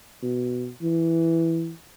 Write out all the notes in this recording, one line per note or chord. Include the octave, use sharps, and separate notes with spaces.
B2
E3